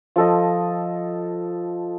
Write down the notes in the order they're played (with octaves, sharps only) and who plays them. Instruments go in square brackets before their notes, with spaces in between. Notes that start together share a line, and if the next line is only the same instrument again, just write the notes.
[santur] F3 A4 D#5